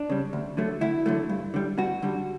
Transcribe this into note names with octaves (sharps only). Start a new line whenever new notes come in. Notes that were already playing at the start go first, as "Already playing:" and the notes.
Already playing: D4
C#3 G3
D2
D3 F#3 A3
D2 E4
D3 F#3 A3
G2
D3 G3
G2 F#4
D3 G3